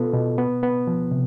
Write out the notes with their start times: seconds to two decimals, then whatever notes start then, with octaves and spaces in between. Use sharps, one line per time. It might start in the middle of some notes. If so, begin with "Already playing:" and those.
Already playing: B2 B3 F4 A4
0.14 B2
0.38 B3
0.63 B3
0.87 F3
1.11 C3